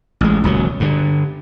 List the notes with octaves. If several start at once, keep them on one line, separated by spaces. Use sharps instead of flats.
A1 G#3
D#1 C#2 C#3 F#3
G2 D3